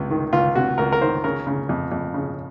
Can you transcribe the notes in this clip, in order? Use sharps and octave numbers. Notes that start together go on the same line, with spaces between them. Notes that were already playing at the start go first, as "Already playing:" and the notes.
Already playing: C#2 C3
D#3
C#2 F4
C3 F#4
C#2 A#4
A#4
D#3 C5
C#3 A#4
C#3
F2
F2
C#3